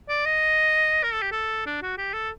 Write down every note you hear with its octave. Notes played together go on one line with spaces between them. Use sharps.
D5
D#5
A#4
A4
G4
A4
D4
F#4
G4
A4